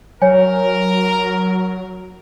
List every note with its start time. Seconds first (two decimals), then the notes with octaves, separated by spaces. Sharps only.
0.22 F#3 A#4 C#5 G#5